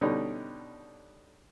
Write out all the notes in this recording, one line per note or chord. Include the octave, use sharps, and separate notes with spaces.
B2 D3 G3 C#4 D#4